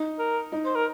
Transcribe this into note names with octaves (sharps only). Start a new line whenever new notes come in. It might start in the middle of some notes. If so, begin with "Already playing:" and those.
Already playing: D#4
A#4
D#4
C5
A#4